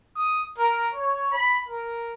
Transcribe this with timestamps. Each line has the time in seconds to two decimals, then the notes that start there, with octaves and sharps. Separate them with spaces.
0.16 D#6
0.56 A#4
0.92 C#5
1.32 B5
1.68 A#4